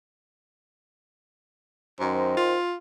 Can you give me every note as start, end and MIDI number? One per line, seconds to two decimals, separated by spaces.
2.00 2.35 42
2.00 2.56 51
2.00 2.56 72
2.37 2.74 65